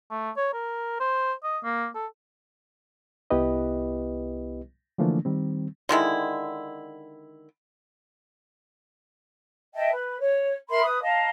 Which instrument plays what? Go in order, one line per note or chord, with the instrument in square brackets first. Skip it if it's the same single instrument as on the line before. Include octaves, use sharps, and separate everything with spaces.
[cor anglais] A3
C#5
A#4
C5
D#5
A#3
A4
[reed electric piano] C2 B3 E4 G4 B4 D#5
D3 E3 F3 A3 A#3 D4
D#3 G3 C4
[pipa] D3 D#3 G#3 E4
[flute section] D#5 E5 G5 A5
B4
C#5
A#4 E5 B5 C6
B4 D#6
D#5 F5 A5 A#5